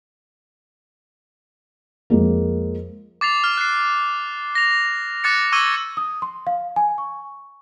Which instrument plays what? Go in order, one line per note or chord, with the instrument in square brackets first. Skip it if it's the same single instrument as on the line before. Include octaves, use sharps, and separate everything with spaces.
[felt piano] F2 G#3 A#3
[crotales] D6 A6 C7 F7
F6
F#6 C7
A#6 F7
D6 F#6 A6 C#7
C#6 D6 E6 G#6 D#7 G7
[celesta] D#6
C6
F5
G#5
C#6